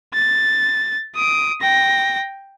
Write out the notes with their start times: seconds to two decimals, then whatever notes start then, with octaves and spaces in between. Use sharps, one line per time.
0.14 A6
1.15 D#6 D7
1.61 G5 A#6